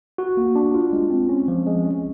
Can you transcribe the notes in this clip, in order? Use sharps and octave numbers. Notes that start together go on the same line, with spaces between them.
F#4
A#3
D4
F4
G#3
C4
C#4
F3
G#3
C#4